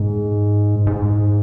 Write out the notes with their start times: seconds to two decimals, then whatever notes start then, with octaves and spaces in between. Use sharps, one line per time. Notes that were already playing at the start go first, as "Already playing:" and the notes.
Already playing: G#2
0.87 G#2